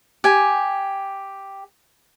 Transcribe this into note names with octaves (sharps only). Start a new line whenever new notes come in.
G4 G#5